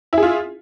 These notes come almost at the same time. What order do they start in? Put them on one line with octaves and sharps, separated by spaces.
E4 G#4 F4